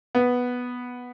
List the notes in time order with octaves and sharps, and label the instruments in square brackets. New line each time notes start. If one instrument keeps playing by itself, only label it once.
[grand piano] B3